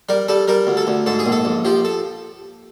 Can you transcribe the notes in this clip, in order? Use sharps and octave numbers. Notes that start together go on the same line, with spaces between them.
G3 A#4
G3 A4
G3 A#4
D2
A4
D2
G#2 A4
G#4
A#1
A4
A#1
F3 G4
A4